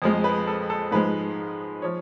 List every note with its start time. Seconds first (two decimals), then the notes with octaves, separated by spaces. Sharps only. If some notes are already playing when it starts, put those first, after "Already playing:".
0.02 F2 F3 G#3
0.24 B4
0.47 A4
0.70 A4
0.91 G#2 F3 G#3 B4
1.82 F3 C#5